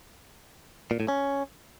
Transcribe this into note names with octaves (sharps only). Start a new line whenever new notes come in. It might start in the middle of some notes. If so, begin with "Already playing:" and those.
A#2
A2
C#4